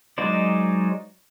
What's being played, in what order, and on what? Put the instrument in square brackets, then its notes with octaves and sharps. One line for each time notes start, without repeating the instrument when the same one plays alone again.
[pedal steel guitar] F#3 G#3 D#4 C5 D5